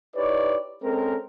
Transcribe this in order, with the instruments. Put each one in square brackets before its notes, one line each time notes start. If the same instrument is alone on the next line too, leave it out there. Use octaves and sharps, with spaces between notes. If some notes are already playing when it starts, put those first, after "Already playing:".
[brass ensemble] D#4 E4 G4 B4 C#5 D5
G#3 C4 C#4 A4 A#4